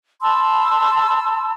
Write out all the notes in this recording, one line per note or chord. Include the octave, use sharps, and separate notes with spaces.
A5 B5 C6 E6